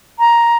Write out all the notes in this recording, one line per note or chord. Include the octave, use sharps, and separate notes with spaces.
A#5